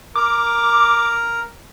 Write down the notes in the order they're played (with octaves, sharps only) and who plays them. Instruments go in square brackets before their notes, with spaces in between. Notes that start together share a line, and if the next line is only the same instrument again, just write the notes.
[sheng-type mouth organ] A#4 [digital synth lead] D6